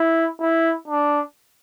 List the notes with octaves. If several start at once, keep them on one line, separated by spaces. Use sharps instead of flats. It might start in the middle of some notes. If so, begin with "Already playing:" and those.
Already playing: E4
E4
D4